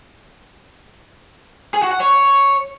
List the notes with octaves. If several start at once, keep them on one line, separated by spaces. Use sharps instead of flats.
G#4
F#4
F#5
C#5